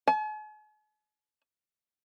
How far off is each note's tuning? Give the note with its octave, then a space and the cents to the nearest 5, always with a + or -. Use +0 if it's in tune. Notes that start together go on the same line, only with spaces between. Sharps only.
G#5 +45